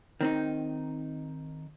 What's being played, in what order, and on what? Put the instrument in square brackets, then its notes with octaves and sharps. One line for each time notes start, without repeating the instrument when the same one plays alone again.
[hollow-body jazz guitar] D#3 C4 D#4